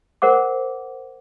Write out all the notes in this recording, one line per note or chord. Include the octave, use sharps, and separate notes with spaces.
A#4 C5 F#5 D6